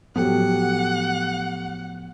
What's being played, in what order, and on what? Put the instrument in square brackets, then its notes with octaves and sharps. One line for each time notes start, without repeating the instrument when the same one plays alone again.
[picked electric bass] A2 F3 B3 [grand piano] F#3 G4 A4 [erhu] F#5